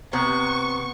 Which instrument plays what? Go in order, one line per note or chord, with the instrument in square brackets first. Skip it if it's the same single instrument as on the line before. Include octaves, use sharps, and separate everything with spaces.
[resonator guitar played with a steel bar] C3 [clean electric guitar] B3 [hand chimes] A#5 [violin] C#6